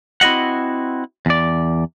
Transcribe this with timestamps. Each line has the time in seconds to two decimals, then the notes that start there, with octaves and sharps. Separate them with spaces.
0.21 C4 E4 F#4 D#5 F#5
1.26 E2 D5